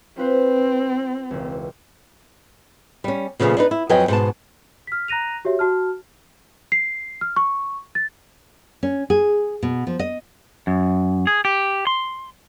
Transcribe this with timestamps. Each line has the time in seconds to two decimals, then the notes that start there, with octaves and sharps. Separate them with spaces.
0.18 C4 F4 B4 C5
1.31 E1 C#2
3.04 G3 C#4
3.40 A#2 C#3 F3 A3 B3
3.57 D4 D#4 B4
3.71 E4
3.89 F2 F#3 B4 D#5 G5 G#5
4.08 G#2 B2 A5
4.87 F6 B6
5.08 A#5 F#6 A#6 D#7 F7
5.45 F#4 G4 C#5 E5
5.59 F#4 A5 F6
6.72 C7
7.21 F6
7.36 C#6
7.95 A6
8.83 C#4
9.10 G#4
9.63 B2
9.87 F3
9.99 D#5
10.67 F#2
11.27 G#4
11.45 G4
11.87 C6